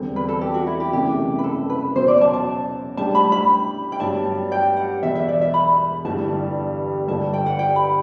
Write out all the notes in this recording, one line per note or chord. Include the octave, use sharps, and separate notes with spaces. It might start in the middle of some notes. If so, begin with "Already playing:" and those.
Already playing: E1 E2 D3 G3 C4
B4
A4
G4
F#4
E4
G4
F#1 E2 C3 E3 A3 G4
B4
A4
B4
E2 B2 F#3 C5
D5
A5
A5
A2 G3 D4 G4 A5
B5
B5
G5
G2 F#3 B3 D4 A5
G5
F#5
E1 E2 B2 E5
E5
D5
E5
B5
G1 G2 E3 G3 A5
G1 G2 D3 G3 A5
G5
F#5
G5
B5